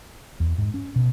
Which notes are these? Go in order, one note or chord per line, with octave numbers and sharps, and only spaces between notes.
E2
G#2
C#4
B2